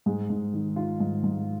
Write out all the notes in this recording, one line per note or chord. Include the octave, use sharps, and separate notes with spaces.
G#2 G#4
G#2
D#3
D#3 F4
G#2
G#2